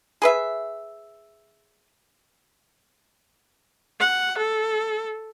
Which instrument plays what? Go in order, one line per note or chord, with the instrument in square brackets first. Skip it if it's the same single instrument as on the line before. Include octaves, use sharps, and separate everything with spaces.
[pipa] G#4 B4 E5
[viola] F#5
A4